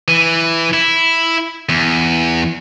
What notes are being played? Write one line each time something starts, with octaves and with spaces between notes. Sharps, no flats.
E3
E4
E2